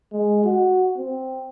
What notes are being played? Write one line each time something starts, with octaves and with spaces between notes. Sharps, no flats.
G#3
F#4
C4